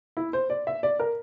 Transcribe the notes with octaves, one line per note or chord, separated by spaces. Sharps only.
E4
C5
D5
E5
D5
A#4